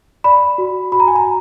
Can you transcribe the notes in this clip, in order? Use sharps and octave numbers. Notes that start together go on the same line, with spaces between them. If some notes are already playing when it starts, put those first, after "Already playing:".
D5 B5
F#4
F#4 B5
A#5
G#5
A#5